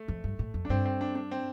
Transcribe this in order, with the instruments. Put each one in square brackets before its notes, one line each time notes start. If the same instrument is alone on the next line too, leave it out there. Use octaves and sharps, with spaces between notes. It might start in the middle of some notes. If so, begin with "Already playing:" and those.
Already playing: [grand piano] A3
[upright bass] F2
G2
A2
F2
[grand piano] D4
[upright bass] G2 [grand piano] C4
[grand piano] C4
D4
D4
C4